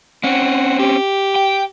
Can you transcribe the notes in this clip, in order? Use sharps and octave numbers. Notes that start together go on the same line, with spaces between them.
C4 C#4 F#5
G4
G5